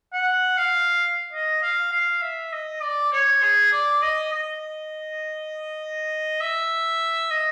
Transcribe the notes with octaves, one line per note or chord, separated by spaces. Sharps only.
F#5
F5
D#5
F5
F5
E5
D#5
D5
C#5
G#4
D5
D#5
D#5
E5
D#5